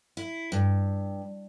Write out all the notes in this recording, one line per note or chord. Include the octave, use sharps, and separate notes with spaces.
E4
G2